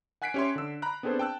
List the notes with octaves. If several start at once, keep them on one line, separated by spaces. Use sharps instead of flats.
F#5 G#5 F#6 B6 C7 D7
C#4 G4 C#5 E5 C6
D3 E6
A#5 B5 F#6
B3 C4 D4 G#4 A4 C5
G5 A5 E6 F#6